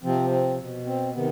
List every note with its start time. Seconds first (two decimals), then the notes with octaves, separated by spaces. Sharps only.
0.03 C3 F3 C4
0.30 C4
0.58 B2
0.85 C4
1.13 C3 D#3 B3